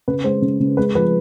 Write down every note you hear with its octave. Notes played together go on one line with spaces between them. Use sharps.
C#3 B4
G#3 C5
C#3
C#3
G#3 B4
F3 B4